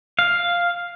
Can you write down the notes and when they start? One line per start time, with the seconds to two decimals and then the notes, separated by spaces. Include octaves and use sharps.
0.19 F5